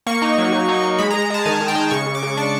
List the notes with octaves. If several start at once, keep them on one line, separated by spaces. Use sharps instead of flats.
A#3 C#6
D#4
F#3
F#3
D#4
D#4
G#3 B5
A#5
G#3
A#5
G#3 A5
D#3 G#5
D#3
G5
G#3
C#3 C#6
C#3
D6
C#3
D4 C#6